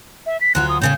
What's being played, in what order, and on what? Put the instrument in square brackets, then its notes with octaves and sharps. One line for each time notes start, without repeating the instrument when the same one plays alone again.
[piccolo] E5
B6
[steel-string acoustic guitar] D2 F#3 F4 [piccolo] F#6
[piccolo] D#6
[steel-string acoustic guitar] A2 C#3 C#4 [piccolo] G6